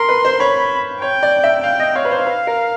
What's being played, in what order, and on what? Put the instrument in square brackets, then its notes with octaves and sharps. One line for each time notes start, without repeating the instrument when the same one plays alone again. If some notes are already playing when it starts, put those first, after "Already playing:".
Already playing: [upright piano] A#4 [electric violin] C6
[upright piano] B4
C5
[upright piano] C#5 [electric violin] B5
[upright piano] C#5 [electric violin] G5
[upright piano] D5
E5
[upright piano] F5 [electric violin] G5
[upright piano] D#5
[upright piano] C#5 [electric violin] F5
[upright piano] B4
C5
B4
A#4